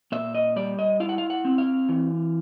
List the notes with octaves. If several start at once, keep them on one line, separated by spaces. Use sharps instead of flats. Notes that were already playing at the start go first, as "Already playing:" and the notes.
A#2 E5
D#5
G3 D5
D#5
E4 F5
F#5
F5
F#5
C4
F5
E3